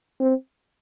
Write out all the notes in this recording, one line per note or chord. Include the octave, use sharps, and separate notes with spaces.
C4